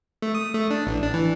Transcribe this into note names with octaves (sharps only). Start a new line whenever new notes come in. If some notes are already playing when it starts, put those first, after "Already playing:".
A3
D#6
A3
D4
A1
D4
E3